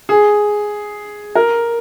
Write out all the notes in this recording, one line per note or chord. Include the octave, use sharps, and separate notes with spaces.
G#4
A#4